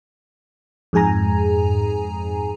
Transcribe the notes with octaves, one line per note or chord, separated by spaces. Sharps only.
F2 G#2 G#4 G#5 A#5